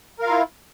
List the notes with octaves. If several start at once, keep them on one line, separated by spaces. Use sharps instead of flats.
E4 F4 A#4 F5